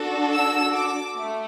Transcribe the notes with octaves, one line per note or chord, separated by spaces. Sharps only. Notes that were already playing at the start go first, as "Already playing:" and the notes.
Already playing: D4 F#4 A4
E6
D6
A3